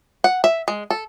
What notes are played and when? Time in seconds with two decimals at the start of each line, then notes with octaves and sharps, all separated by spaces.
0.24 F#5
0.44 E5
0.68 G#3
0.90 A4